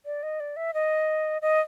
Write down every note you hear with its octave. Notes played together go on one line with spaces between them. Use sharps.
D5
D#5
D5
E5
D#5
D#5